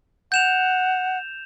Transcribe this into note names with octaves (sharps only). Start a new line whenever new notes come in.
F#5 G6 E7 F7